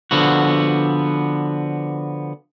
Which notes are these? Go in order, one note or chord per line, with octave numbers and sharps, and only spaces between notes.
D3 F3 B3 F#4